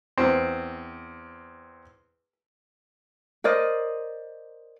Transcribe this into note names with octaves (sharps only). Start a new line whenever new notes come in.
E2 C4
A#4 C5 D5 D#5